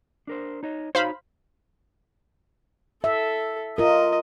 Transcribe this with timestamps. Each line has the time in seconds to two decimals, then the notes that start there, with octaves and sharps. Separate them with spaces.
0.27 D4 A#4 C5
0.63 D#4 C#5 D#5
0.95 D#4 F#4 C5 C#5 F5 B5
3.04 A4 E5
3.78 F4 A#4 D#5